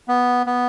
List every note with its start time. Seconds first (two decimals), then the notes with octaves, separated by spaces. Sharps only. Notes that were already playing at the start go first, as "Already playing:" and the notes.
0.08 B3
0.46 B3